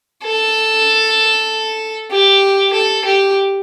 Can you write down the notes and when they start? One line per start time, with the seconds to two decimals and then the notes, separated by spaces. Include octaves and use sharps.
0.24 A4
2.11 G4
2.73 A4
3.05 G4